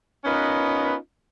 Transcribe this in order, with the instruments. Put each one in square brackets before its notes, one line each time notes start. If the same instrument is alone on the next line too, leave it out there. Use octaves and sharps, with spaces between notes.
[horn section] B3 C#4 D#4 F4 A#4 B4